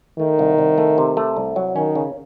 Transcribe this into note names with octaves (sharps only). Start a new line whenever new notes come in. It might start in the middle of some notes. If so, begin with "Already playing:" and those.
D#3 A3
C2
C2
A3
C3
A3
C2
F#3
D#3 C#4
C#3